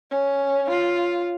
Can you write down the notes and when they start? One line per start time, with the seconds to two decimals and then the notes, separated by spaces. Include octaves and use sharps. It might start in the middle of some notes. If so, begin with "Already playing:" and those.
0.11 C#4
0.70 F4